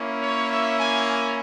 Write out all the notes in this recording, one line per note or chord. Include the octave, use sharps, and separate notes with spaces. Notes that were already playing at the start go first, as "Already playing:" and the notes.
Already playing: A#3 C#4 E4
C#5
E5
G#5
G#5